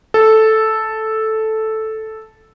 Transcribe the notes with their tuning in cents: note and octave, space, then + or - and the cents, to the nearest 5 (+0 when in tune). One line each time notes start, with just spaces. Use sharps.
A4 -5